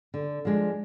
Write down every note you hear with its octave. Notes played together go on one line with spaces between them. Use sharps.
D3
F3 G#3 D4